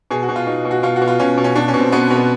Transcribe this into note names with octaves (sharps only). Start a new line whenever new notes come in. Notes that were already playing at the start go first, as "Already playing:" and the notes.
B2 G#4
F#4
B2
F4
B2 D#4
B2
F#4
B2 F4
F#4
B2
F4
B2 C#4
B2
C#4
B2 D4
C#4
B2
C4
B2 B3
B2
B3